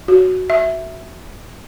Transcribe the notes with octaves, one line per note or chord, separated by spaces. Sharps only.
F#4
E5